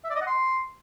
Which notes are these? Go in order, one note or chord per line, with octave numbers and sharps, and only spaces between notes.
E5
D5
D#5
F#5
C6